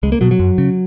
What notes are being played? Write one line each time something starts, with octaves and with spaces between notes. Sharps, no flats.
C#2 G#3
A#3
B2 F#3
F#3
F#2
C#3